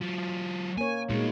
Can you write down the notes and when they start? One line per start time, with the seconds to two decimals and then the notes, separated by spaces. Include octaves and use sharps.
0.02 F#3 F4
0.77 A#3 C#5 G#5
1.10 A#2 G#3 D#4 F#4